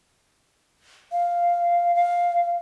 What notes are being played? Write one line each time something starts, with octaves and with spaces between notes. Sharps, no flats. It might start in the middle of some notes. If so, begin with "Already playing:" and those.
F5
F5